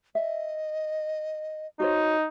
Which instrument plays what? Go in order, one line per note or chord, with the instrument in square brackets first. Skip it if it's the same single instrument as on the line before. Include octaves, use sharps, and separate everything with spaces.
[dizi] D#5 [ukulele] E5
[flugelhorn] D#4 [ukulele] F#4 C5 C#5